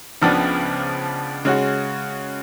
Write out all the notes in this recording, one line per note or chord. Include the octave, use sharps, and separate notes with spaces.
C#2 C#3 F3 B3 D4
C#3 G#3 C#4 F#4